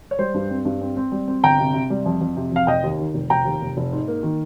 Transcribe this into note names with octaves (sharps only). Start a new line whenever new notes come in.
C#5
G3 C5
G2
C4
G2
C4
C4
G3
C4
G1 G5 A#5
C3
C3
G3
F2
F2
C3
F2 F5
F1 D#5 G5
D#2
D#3
F1
F1 G5 A#5
D#2
F1
F1
G#2
A#3
D#3